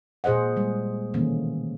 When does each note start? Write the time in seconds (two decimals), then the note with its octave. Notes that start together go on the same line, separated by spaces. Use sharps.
0.24 A#2 G#4 C5 D#5 F#5
0.57 G3 G#3
1.14 B2 D#3 E3 A3 A#3 C#4